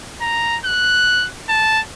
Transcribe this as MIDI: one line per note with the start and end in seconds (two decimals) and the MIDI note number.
0.21 0.58 82
0.65 1.27 90
1.49 1.80 81